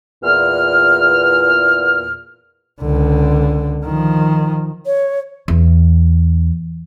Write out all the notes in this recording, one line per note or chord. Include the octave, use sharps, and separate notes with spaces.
E2 A#2 F6
C#2 D3
D#3 F3
C#5
E2